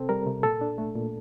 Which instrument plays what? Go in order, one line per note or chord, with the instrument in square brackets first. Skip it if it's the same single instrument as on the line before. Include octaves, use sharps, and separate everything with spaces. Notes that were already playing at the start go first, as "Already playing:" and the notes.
Already playing: [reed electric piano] C3 C4 A4
G3 A#4
C3
A#2 A4
D4
A3
A#2